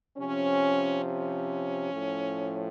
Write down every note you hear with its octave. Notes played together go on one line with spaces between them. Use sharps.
C3 F3 C#4
C#4
A2 F3